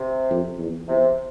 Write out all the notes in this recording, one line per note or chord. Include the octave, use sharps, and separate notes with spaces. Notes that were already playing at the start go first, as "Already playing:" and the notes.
Already playing: C3
F2
E2
E2 C3